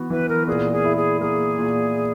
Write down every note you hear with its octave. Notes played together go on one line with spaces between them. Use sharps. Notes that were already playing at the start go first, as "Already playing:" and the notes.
Already playing: E3 B3 F#4
E3 B4
A#4
A#2 G#4
G#4
E4
G#4
A#3 G#4
A#2